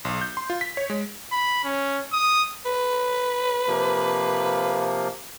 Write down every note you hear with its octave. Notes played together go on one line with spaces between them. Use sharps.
B1
G6
C6
F4
B6
C#5
G#3
B5
C#4
D#6
B4
C3 F3 A#3